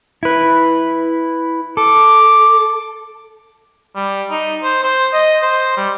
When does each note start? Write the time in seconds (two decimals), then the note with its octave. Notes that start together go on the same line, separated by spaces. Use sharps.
0.23 E4 B4
1.77 A4 D6
3.96 G3
4.30 D#4
4.63 C5
4.84 C5
5.13 D#5
5.42 C5
5.77 G3